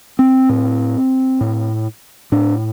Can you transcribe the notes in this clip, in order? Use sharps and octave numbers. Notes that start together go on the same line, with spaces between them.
C4
A2
A2
A2 D4